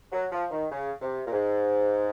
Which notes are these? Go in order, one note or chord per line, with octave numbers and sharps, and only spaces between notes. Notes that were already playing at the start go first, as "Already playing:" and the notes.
F#3
F3
D#3
C#3
C3
A#2
G#2